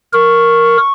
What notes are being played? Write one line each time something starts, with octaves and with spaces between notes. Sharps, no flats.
A#4 C#6